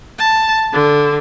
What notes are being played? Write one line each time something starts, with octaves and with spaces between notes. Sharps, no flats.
A5
D3